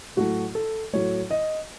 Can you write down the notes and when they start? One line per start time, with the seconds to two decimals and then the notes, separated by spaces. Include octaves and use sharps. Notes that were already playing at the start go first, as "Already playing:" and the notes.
0.16 A2 F#3 A3 F#4
0.55 A4
0.93 A2 F#3 A3 C#5
1.30 D#5